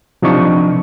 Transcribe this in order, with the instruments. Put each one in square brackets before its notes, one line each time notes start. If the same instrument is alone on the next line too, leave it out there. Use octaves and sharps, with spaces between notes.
[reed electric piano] C3 F3 D4 D#4 C#6